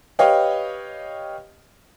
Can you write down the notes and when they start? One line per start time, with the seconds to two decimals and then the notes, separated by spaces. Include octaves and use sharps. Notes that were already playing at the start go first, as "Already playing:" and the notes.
0.19 G4 B4 C#5 D#5 F5 G5